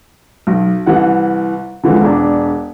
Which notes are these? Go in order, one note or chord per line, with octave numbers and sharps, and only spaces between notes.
B1
C2 E3 F#5
D3 E3 F3 G#3
E1 D4